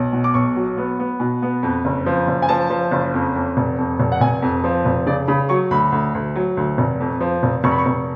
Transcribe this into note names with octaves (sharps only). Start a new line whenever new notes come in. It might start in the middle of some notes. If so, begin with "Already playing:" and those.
Already playing: B1
B2
D6
B1 C#6
F#3
B3
B3
B2
B3
F2
F#1
F3
F#1
G#5
F3 A5
F3
F#1
F2
F2
F1
F2
F1
F#5
F1 G#5
F2
F3
F1
C#3 D5
C#3 B5
F#3 C#6
D2 B5
D2
D2
F#3
D2
F1
F2
F3
F1
F1 C#6
B5
C#6
F1